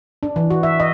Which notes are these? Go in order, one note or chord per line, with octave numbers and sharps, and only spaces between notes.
D4
E3
F#4
E5
D#5